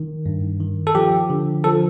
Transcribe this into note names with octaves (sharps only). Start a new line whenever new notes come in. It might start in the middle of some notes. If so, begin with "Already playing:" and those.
Already playing: D#3
G2
D#3
A4
F3 G4
D3
F3 A4